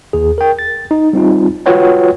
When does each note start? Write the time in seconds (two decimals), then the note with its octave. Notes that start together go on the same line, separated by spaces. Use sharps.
0.13 D#2 G#4
0.38 A#4 G5
0.59 A6
0.91 D#4
1.13 G3 C4 D#4 F4
1.66 F4 F#4 B4 C#5 F#5 G5